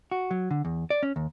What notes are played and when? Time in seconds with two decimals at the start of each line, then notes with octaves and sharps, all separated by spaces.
0.11 F#4
0.31 F#3
0.51 D3
0.65 E2
0.90 D5
1.03 C#4
1.16 D#2